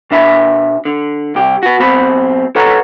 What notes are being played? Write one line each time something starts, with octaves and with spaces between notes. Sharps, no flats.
B2 D4 E5 B5
D3
C2 G4
F#4 B4
B1 B2 C4 B5
A4 B4 C#5 F#5 A#5